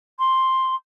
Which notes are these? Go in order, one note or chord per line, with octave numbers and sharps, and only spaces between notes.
C6